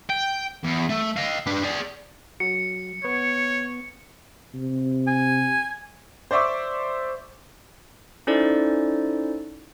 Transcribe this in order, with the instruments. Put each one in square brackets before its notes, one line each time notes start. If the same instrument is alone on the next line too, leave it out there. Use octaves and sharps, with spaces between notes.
[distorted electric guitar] G5
E2
A3
D#5 F5
D4 B4
G#4 D5
[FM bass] F#3 [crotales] C#7
[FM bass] B3 [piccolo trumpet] C#5
[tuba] C3
[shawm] G#5
[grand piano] C5 D5 E5 C#6 D6
[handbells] C#4 D#4 E4 A4 C5 D5